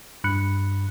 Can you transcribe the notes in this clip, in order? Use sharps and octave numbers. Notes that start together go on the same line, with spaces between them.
G2 B5 F#6 C#7